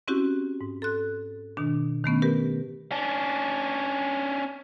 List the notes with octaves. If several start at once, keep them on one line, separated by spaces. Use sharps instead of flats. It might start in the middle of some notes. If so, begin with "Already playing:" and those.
C4 C#4 E4 F#4 G4
G#2
A4 C6 F#6
B2 D#3 D4
D#3 A3 B3 C#4
G4 A#4 B4
C#4 D4